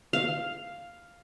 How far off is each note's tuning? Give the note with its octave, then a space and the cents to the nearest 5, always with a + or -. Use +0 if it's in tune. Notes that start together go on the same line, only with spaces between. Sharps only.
F5 +0